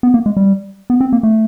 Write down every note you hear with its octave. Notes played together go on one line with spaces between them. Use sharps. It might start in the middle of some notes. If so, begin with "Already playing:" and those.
B3
A#3
G#3
G3
B3
C4
A#3
A3